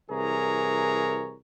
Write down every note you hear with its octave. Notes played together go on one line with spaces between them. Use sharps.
C2 E3 G#4 A#4 C#5 A#5